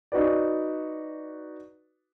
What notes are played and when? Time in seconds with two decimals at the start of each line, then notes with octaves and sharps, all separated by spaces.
0.12 D#4 F#4 B4 D5